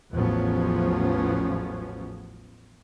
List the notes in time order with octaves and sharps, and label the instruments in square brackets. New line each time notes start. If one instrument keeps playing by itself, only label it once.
[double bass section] A1 E2 F3 F#3 B3 C#4